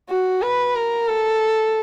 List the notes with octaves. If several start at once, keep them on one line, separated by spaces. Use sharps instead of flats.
F#4
B4
A#4
A4